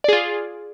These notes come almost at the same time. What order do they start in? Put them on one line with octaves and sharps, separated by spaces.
D5 G#4 F4